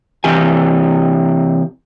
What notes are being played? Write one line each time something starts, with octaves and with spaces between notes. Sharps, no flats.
C3 E3 G4 G#5